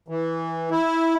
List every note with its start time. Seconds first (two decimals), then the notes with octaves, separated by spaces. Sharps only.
0.08 E3
0.71 E4